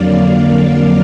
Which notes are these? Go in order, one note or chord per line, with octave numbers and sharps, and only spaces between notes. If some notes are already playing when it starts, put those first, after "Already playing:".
Already playing: F2 D3 F#3 A#3 D5 F5